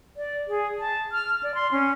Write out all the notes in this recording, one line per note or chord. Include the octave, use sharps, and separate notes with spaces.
D5
G#4
A5
F6
D5
C6
C#4